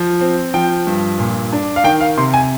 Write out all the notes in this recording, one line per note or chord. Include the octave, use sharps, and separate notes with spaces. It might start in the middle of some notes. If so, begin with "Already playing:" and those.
Already playing: F3
C4
F3 G5
G2
A#2
D4
F5
D#3 G5
F5
C3 C6
G#5